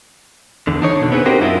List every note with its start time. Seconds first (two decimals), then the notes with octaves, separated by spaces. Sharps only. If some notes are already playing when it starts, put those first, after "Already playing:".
0.67 E2 D3
0.82 D4 D#4 C#5
1.01 B2 D3
1.12 B3 C4 E4 G#4 B4
1.25 D4 D#4 F#4 G4 A#4 C5
1.40 F#2 E4 F4 A#4 D#5